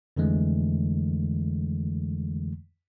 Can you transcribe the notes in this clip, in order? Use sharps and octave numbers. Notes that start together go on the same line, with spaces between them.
F2 D3 E3 G#3 A3